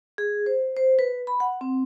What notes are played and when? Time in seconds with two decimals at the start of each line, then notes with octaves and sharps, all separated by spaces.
0.18 G#4
0.46 C5
0.77 C5
0.99 B4
1.27 B5
1.40 F#5
1.61 C4